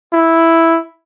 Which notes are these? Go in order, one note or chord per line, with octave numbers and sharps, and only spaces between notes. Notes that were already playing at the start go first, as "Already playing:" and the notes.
E4